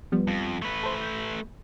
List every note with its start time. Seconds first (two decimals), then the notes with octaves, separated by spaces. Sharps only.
0.12 F3 G3 B3
0.28 F2
0.62 A3 B4
0.83 A4 C5
1.01 G6